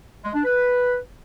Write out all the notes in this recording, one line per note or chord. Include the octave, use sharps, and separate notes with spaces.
G#3
D4
B4